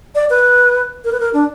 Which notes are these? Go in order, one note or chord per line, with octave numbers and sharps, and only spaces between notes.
D5
B4
A#4
B4
A#4
D4